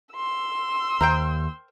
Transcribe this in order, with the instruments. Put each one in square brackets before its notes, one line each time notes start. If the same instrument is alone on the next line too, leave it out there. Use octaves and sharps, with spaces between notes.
[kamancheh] C6 E6
[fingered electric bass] D#2 [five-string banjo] A#4 C5 G5